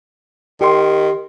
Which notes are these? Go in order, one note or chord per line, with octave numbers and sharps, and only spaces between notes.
D#3 G4 C6